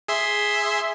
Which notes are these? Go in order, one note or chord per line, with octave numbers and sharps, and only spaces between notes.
G#4 E5 C6